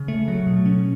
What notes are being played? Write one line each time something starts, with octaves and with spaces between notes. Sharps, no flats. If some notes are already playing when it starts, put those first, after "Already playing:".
Already playing: C#3
A3
F#3
B2
C#4